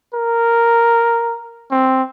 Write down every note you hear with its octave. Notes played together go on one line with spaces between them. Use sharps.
A#4
C4